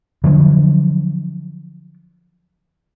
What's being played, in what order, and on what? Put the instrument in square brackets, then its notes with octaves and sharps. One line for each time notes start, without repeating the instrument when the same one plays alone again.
[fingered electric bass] D3 F3 F#3 D4